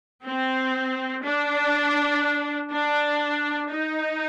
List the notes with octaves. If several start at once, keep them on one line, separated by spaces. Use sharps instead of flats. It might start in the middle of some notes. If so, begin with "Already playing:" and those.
C4
D4
D4
D#4